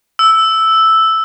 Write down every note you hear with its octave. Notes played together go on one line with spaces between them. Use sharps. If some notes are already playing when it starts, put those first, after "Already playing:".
E6